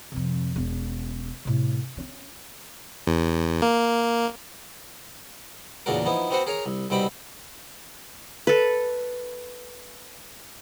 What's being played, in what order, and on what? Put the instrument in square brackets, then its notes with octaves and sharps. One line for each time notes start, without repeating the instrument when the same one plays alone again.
[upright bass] F2 C3
E1 C#4
A2 C3
G2 C#4
[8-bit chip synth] E2
A#3
[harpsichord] E2 A#2 C#3 D4 F#4 A#4
F3 B3 D#4 E4
B3 C4 F#4 B4 C5 F#5
G#4 A#4 C#5 A#5
C2
C2 B2 G3 C4 G5 B5
[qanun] A4 B4